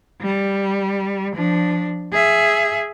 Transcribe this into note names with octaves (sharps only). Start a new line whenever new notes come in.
G3
F3 D4
G#4 E5